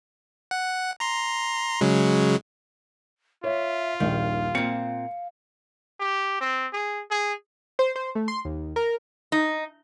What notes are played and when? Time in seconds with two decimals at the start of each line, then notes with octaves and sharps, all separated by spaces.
0.51 F#5
1.00 A#5 C6
1.81 C#3 F#3 G#3
3.44 F4 C#5 E5
4.00 D#1 A#1 D#3 F5
4.55 A#2 C4 C#7
6.00 G4
6.41 C4
6.73 G#4
7.11 G#4
7.79 C5
7.96 C5
8.15 A3
8.28 C6
8.45 D#2
8.76 A#4
9.32 D#4